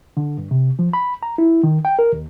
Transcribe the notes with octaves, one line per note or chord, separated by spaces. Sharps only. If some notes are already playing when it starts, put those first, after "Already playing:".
D3
G2
C3
F3
B5
A#5
E4
D#3
G5
A#4
D#2